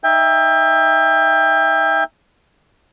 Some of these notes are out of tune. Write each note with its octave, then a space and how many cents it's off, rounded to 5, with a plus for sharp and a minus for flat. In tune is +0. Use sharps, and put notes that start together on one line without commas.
D#4 +0 E5 +0 G5 +30